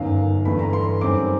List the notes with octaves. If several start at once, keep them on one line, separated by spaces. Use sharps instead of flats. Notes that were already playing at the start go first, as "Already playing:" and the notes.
Already playing: G1 F#2 D#3 F5
G2 E3 A3 B5
A#5
C6
F#2 D#3 G3 C4 D6